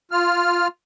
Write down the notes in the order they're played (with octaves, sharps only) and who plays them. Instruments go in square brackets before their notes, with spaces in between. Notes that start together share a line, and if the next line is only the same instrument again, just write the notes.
[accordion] F4 F6